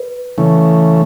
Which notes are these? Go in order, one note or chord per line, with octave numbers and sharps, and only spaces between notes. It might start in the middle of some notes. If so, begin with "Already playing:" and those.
Already playing: B4
C#3 E3 A3